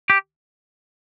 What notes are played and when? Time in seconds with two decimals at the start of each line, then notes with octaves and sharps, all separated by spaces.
0.10 G4